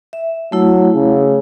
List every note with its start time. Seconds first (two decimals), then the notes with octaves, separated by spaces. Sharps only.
0.13 E5
0.52 F#3 A3 E4
0.95 C#3